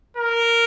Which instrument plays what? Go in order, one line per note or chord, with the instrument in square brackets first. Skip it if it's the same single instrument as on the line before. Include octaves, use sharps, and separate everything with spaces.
[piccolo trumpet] A#4